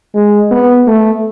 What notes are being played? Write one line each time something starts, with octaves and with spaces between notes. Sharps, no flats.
G#3
B3
A3